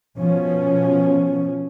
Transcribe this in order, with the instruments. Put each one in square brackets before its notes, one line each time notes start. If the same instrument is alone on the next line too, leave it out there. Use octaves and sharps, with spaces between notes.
[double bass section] B2 F3 C#4